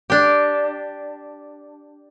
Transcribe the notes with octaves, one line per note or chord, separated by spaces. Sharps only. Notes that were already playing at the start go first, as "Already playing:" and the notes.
D4 G4